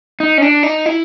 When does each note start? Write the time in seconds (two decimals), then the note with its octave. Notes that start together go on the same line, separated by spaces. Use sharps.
0.20 D#4
0.38 C#4
0.42 D4
0.63 D#4
0.86 E4